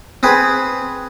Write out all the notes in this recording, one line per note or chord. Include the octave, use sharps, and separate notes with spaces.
C4 G#4 B4